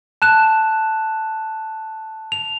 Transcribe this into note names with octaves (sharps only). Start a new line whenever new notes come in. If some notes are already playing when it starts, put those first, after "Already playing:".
A5 F#6 E7
F7